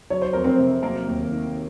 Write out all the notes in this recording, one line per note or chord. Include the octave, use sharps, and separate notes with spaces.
F#3 C#5
C5
F2 A#4
C4 C5
C3
F#3 A#3 A#4
D#2
D#3